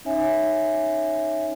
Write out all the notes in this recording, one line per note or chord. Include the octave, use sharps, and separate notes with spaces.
C#4 D#4 C#5 E5 G#5